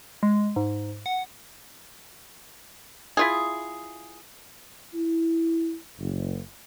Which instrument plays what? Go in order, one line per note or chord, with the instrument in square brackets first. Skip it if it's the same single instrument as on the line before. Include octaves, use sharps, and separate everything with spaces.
[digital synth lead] G#3
G#2
F#5
[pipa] E4 F4 G#4
[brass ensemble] E4
F#1